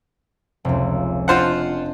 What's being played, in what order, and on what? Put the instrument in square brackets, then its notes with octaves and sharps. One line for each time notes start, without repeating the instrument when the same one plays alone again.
[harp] F1 C#2
[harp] D4 D#5 [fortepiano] F4 C5 F#5